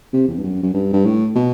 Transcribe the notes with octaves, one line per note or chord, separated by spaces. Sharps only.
C3
E2
G2
F#2
F#2
G2
G2
A2
B2